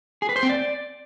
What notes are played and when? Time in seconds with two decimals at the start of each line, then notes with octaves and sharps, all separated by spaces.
0.22 G#4
0.29 B4
0.36 C5
0.43 C4
0.50 D5